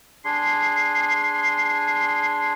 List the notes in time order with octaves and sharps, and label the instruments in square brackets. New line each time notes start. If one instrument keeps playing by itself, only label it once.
[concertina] D4 G#4 C6 [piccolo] C7